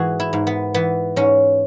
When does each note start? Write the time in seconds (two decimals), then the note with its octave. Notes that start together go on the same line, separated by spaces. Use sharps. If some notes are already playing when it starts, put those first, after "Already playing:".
Already playing: G#2 E3 F#4 G#4 B4
0.20 E4
0.33 G#2
0.47 B3
0.74 E3 B3
1.16 G#2 C#4